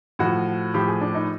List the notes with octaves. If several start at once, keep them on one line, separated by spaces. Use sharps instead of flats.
A2 F3 F#4
A2 F3 G4
G#4
D4
D#4